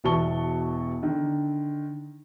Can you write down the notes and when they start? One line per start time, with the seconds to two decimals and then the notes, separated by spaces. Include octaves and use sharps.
0.04 E1 B2 E3 A5 C#6 G7
1.02 D3 D#3